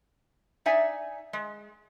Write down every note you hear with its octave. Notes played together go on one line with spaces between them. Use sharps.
D#4 D5 E5 G#5
G#3